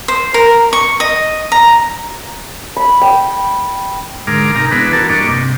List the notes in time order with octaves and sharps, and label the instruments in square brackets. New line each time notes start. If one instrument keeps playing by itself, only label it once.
[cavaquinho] C5
A#4
C#6
D#5
A#5
[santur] B5
G5
[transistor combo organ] G#2 D3 G#3 A#4 D6 F6
C3 D#4 A#4 A#5 F6
E3 G#3 B3 D4 B4
E4 F#4 A4 A#4 A5
G2 A#3 D4 D#5 C#6 D6
C3